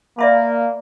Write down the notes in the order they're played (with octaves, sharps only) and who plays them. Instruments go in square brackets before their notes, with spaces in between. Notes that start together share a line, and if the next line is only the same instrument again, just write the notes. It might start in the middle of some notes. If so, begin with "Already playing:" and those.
[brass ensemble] A#3 [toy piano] D5 E5 B5